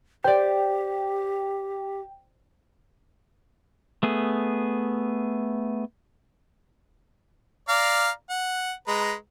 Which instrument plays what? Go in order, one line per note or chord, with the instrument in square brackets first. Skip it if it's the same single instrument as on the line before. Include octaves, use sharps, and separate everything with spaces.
[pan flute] G4 [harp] C5 D5 [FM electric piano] G5
[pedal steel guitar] A3 B3 G#4
[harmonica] D5 F5 A#5
F#5
G#3 B4 A#5